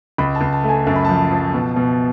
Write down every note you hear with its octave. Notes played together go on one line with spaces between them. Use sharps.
C#2 B5
A5
C#2
A5
A3
G#5
F#2 A5
B5
F3 A5
F3
B2
B2